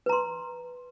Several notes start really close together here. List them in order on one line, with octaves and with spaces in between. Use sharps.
B4 A#5 C6